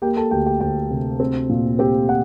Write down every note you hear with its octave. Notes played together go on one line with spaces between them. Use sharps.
A#3 G4 G5
A4 A5
D2 G4 G5
G4 G5
D2 G4 G5
C3
C4
A#2
C4 G4 G5
F#5